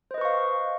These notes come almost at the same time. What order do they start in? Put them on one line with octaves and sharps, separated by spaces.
C5 D#5 B4 C#6 F5